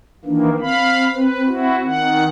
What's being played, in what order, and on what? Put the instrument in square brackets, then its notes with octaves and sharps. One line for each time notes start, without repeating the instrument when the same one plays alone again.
[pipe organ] D#3 E3 A#3 [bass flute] D4
[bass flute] C4 [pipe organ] F5 B5
[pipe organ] B4
E4 F#4
D#3 F#5